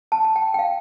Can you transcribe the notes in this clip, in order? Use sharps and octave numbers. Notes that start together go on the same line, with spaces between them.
A5
A5
G5
G5
F5